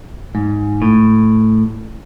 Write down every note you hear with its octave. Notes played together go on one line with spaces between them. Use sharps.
G#2
A2